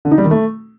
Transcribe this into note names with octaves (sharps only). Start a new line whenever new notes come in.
D3
D#4
G3
D#3
A3